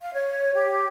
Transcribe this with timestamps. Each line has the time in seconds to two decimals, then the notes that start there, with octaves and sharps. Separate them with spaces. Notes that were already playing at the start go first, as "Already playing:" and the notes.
0.01 F5
0.14 C#5
0.54 G4